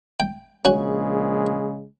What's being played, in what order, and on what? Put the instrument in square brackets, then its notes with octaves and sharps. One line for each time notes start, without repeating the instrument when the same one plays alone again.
[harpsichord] G5
[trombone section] A#1 C#3 G#3 [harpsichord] C#4 F#4